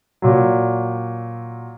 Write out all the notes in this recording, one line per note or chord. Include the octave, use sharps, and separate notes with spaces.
A#2 F#3